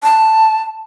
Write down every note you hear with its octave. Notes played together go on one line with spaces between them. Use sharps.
A5